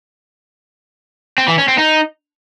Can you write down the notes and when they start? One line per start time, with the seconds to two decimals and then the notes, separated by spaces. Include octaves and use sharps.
1.38 C4
1.48 E3
1.58 C#4
1.68 C4
1.78 D#4